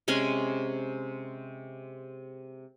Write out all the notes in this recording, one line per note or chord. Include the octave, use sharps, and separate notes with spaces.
C3 G#3 C#4 G#5